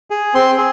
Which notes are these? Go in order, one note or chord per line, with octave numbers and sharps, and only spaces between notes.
G#4
C4 C6
G#4